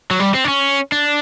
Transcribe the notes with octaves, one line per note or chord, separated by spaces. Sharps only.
F#3
G3
C4
D4
C#4
D4